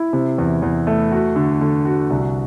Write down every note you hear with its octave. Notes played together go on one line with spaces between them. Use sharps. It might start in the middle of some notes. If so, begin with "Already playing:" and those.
Already playing: E4
C3
E2
E2
A3
F#4
D3
D3
F#4
C2